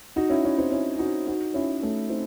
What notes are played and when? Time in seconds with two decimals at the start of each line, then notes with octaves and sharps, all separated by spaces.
0.16 D#4 F#4
0.30 C#4 E4
0.44 C#4 E4
0.58 C4 D#4
0.72 C#4 E4
0.99 D#4 F#4
1.27 D#4 F#4
1.54 C#4 E4
1.82 A3 C#4
2.09 C4 D#4